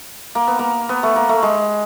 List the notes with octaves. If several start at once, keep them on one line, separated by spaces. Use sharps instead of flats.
A#3
B3
A#3
B3
A3
A#3
A3
G#3